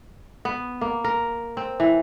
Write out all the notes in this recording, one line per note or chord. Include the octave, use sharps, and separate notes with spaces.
B3
A#3
A#4
C4
E3